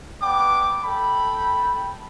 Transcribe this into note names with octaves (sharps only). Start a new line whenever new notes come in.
B3 D4 G5 D6
A4 G5 B5